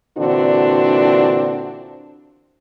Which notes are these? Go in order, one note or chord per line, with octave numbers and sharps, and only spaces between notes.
A#2 D3 E3 C4 D4 F#4